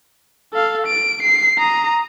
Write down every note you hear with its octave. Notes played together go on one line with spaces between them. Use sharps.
A4 F5
D7
C7
A#5 D#6